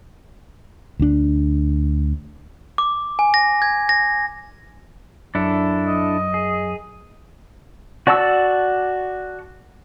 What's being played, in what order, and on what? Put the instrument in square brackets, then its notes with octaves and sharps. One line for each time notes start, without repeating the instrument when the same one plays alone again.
[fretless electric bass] D2 D4
[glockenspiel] D6
G#5
A#6
G#6
A#6
[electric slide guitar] F#2 [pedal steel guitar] D4 E4 A4
[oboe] D#5
[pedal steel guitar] G#4
F#4 D5 A5 C#6 E6